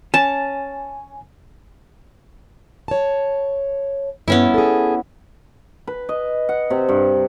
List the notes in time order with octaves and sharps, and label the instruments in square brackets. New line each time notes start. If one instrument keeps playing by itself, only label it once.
[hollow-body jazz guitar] C#4 [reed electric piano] G#5 [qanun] A5
[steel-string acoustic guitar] C#5 A5
[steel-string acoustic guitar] G2 [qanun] B3 C#4 E4
[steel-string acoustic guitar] G#4 A4
[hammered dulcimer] B4
D#5
F#5
C3
G2